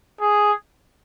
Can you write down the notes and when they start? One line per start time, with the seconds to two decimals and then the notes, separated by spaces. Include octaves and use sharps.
0.21 G#4